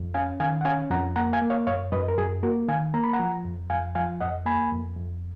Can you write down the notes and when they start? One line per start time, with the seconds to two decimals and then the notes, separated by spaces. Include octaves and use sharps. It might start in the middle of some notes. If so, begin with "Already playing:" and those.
Already playing: F2
0.14 C#4 F5 G#5
0.40 D#3 F5 G#5
0.61 F#5
0.65 C#4 F5 G#5
0.91 F2 F#5 A#5
1.16 A#3 F#5 A#5
1.33 F5 G#5
1.42 A#3
1.50 C#5 F5
1.67 F#2 C#5 F5
1.92 F#2 B4 D#5
2.08 A#4
2.18 F#2 G#4
2.43 A#3 F#4 A#4
2.68 D#3 F5 G#5
2.94 A#3 A#5
3.04 B5
3.13 F#5 A#5
3.19 F3
3.45 F2
3.70 F2 F5 G#5
3.95 F3 F5 G#5
4.20 F2 D#5 F#5
4.46 A#3 G#5 B5
4.72 F2
4.96 F2